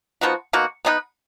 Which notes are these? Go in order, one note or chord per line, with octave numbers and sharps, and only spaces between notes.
F3 B3 D#4 F#4
B2 A#3 D#4 F#4
B3 D#4 G#4 B4